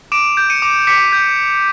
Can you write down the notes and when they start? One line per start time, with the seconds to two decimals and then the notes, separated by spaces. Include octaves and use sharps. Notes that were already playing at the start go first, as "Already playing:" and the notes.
0.12 D6 D7 E7
0.37 G6
0.50 C#7 D#7
0.62 D6
0.87 D6 B6 C#7
1.12 G6